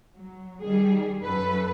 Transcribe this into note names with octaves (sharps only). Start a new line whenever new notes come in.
F#3
D#3 G3 G#4
F#2 A4 B4